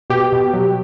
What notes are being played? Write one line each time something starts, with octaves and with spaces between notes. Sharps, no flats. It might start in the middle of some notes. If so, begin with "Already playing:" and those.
B2 G4
B2
F#3